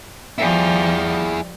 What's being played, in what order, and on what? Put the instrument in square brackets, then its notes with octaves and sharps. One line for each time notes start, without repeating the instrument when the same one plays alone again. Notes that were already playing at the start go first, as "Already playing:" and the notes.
[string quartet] F3 G3 [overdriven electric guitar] E4 G#4